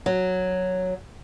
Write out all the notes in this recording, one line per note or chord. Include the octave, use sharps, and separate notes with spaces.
F#3